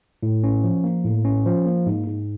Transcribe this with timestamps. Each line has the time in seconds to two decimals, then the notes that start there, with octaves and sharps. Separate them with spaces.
0.23 A2
0.44 C#4
0.64 F3
0.84 A#3
1.04 A2
1.25 C#4
1.45 F3
1.66 A#3
1.86 G#2
2.07 G#2